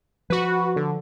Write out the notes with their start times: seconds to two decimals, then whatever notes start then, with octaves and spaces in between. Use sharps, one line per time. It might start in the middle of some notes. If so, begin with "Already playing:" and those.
0.30 F3 F#4 B4
0.76 D3